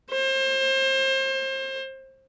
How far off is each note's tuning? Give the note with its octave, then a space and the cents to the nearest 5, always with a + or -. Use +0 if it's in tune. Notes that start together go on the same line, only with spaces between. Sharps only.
C5 +30